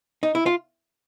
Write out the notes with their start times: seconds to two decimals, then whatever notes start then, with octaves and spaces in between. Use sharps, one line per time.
0.23 D#4
0.35 E4
0.46 F4